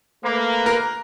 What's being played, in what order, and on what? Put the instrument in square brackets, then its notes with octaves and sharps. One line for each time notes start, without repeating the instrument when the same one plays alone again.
[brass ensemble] A3 B4 [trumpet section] A#3
[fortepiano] A#4